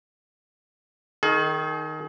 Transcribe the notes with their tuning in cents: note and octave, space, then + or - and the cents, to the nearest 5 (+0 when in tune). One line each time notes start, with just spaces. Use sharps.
D#3 +0 G#4 +40